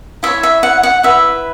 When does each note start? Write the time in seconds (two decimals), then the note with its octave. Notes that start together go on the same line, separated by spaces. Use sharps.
0.23 E4 C#5 E5
0.43 E5
0.63 F#5
0.83 F#5
1.03 E4 B4 E5